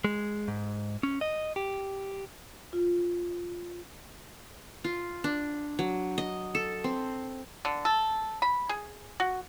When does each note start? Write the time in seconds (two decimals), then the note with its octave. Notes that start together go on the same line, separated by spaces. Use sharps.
0.05 G#3
0.48 G#2
1.03 C#4
1.21 D#5
1.56 G4
2.73 F4
4.84 F4
5.24 D4
5.79 F#3
6.18 D#5
6.55 A4
6.84 C4
7.65 D3
7.85 A4
8.42 B5
8.69 G#4
9.20 F#4